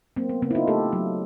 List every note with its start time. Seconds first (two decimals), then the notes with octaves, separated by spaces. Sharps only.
0.16 F#3 A#3 C4
0.29 B3
0.42 C#3 A#3 C4
0.51 E4
0.55 D#4 F4
0.67 A3 G4 A4
0.93 F#3